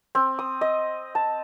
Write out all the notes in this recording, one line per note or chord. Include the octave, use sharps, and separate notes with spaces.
C4
D#6
D#5
A5